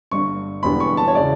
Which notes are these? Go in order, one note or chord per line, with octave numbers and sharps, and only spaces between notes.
G1 G2 D3 C#6
E1 E2 D3 G3 B3 B5
C#6
A5
C#5
C#3 E3 D5